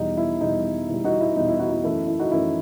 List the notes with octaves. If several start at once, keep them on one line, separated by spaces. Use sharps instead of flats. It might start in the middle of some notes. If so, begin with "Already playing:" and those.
Already playing: E2 B2 G3 D#4
E4
E2 B2 G3 D#4
E2 B2 G3 E4
D#4 F#4
E4
E2 B2 G3 D#4
E4
D#4 F#4
E4
F#2 E3 A3 E4
E4
D#4 F#4
F#2 E3 A3 E4